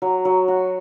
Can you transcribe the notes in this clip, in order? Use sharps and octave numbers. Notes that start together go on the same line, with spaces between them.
F#3
F#3
F#4